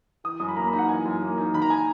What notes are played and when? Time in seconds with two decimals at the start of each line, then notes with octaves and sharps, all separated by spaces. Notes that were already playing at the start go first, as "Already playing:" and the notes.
0.24 E3 D#6
0.40 F#2 D#6
0.48 B5
0.57 A#3 A#5
0.67 B5
0.73 D#4
0.78 F#5
0.89 E3 G#5
1.05 F#2
1.22 A#3
1.38 D#4
1.54 D#3 B5
1.62 A#5
1.70 G#5